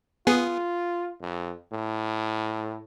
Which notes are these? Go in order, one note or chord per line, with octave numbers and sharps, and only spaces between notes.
B3 F4 G#4
F2
A2